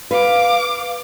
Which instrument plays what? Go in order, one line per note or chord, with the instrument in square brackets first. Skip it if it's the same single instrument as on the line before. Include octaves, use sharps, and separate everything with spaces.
[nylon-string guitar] B4 [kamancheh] F5 D6